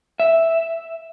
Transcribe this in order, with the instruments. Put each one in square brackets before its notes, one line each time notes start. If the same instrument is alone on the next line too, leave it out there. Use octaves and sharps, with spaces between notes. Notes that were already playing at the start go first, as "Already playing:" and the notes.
[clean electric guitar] E5